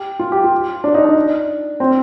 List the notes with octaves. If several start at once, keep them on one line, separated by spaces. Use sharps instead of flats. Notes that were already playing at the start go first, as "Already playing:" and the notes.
Already playing: G4
F4
G4
F4
D4
D#4
D4
C4